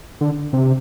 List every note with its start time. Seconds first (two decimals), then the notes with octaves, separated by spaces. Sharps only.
0.21 D3
0.53 C3